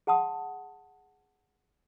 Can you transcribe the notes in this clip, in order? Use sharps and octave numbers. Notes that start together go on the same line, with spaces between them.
G#4 F#5 A5 C6 D#6